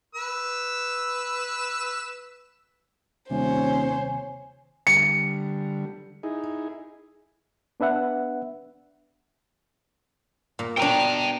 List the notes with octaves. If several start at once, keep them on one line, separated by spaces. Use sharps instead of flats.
B4 E6
D#1 D#2 C3 C5 C#5 G#5
D3 G3 C#7
D#4 E4 G#4
B3 D4 B4 E5 F#5
A#2
B2 D4 G5 A#5